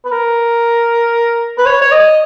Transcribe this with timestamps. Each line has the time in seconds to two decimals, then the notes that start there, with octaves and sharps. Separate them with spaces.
0.05 B4
0.12 A#4
1.58 B4
1.66 C#5
1.82 C#5
1.92 D#5